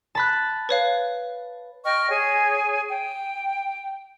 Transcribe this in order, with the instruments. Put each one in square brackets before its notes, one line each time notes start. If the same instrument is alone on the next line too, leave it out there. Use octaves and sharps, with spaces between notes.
[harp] A5 B5 F#6
[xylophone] B4 C#5 F5
[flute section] D#5 G5 C#6 F6
G#4 C#5 G#5
G5